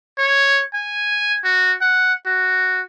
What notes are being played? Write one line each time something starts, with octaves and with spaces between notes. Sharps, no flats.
C#5
G#5
F#4
F#5
F#4